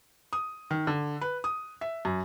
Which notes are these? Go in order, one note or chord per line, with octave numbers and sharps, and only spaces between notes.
D#6
D#3
D3
B4
D#6
E5
F#2